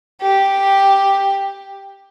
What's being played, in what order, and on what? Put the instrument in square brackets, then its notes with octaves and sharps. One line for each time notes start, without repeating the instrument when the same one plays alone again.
[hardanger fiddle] G4